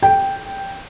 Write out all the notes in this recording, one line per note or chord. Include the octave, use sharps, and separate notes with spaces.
G5